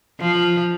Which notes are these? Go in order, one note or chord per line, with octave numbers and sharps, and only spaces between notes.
F3